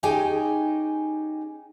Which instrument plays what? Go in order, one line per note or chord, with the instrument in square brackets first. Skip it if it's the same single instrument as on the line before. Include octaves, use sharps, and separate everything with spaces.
[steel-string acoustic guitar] C#4 D#4 G4 G#4 G5 G#5